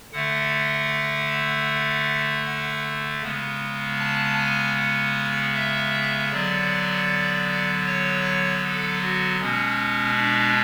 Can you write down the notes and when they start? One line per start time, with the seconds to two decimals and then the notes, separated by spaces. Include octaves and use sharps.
0.13 D3 A3 F#5
2.45 F#5
3.22 C#3 G#3 B3
4.00 A5
4.38 G#5
4.77 F#5
5.54 E5
6.31 D3 F#3 B3 D5
7.86 C#5
8.64 A4
9.02 F#4
9.41 B2 G#3 B3 C#4
10.18 D4